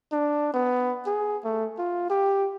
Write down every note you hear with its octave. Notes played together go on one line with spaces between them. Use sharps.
D4
B3
G#4
A3
F4
G4